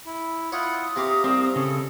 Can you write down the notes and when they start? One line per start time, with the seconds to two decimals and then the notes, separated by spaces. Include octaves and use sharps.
0.06 E4
0.52 E4 F4 C#5 F#5 D#6
0.96 C3 C4 F5 A#5 D6
1.24 C2 C4
1.56 C#3 A4